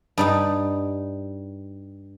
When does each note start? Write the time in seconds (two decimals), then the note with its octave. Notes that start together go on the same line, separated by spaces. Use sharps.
0.18 G2 G3 D#4